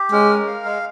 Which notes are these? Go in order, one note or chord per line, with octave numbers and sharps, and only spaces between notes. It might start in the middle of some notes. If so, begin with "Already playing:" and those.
Already playing: G4
G#3 C#4
A#4
F5
G#3